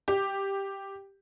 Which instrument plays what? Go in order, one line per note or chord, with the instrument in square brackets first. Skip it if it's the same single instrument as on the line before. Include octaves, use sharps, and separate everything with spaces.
[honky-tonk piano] G4